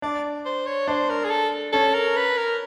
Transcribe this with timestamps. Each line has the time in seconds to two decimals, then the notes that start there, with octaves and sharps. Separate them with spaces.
0.02 D4 D5
0.45 C5
0.67 C#5
0.88 D4 C5
1.10 A#4
1.25 G#4
1.30 A4
1.73 C#4 A4
1.94 A#4
2.16 B4
2.37 A#4